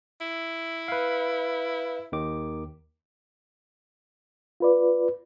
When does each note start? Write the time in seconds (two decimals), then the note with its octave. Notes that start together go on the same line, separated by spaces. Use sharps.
0.21 E4
0.88 B4 F5
2.12 D#2 D#3 D6
4.60 F4 B4 D5